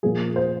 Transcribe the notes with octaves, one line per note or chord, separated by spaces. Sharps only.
A#2 F3 G#4
C5